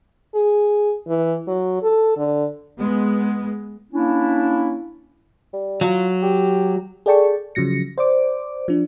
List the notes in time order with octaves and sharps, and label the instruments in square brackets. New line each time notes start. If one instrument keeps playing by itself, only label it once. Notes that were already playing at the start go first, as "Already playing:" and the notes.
[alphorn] G#4
E3
F#3
A4
D3
[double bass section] G#3 B3
[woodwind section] A#3 C#4 D4 E4
[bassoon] G3
[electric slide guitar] F#3 [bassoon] F4
[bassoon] G4
[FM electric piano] G#4 A4 D5 G5 A5 C#6
C#3 F3 F#3 A#6 C#7
C5 D5 D6
F3 D4